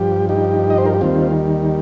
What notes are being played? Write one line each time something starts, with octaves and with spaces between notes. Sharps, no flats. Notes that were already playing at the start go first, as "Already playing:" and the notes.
Already playing: G2 F3 G4
D#4 G4
D#5
C5
A#4
G4
D#2 D#3 G3 C4 F4